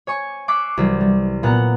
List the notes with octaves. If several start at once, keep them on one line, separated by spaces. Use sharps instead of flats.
C#5 G#5 C#6
C#6 D6 E6 F#6 B6 C7
C2 E3 F#3 B6
G3
A#2 B3 F#5 A#5 F#6